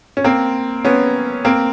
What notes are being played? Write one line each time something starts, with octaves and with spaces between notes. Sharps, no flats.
C#4
A#3 C4
B3 C#4
A#3 C4